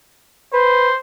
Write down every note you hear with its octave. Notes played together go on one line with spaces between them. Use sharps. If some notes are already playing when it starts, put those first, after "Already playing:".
B4 C5